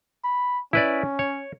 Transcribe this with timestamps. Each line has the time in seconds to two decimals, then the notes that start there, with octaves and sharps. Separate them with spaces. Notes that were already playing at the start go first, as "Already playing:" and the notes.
0.24 B5
0.73 C#4 E4 B4 D5
1.19 C#5